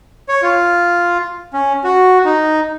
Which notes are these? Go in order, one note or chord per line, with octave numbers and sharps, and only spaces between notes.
C#5
F4
C#4
F#4
D#4